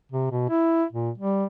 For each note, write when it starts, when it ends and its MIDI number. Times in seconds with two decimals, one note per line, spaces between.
0.12 0.26 48
0.31 0.45 47
0.50 0.84 64
0.93 1.10 46
1.18 1.45 55